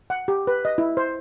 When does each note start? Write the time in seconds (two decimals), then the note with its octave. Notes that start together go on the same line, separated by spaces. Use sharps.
0.10 F#5
0.28 G4
0.47 B4
0.65 D#5
0.78 E4
0.97 C5